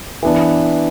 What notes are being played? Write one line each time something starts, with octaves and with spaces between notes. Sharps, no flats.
E3 B3 D4